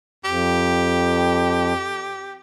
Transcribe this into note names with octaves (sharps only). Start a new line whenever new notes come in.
F2 G4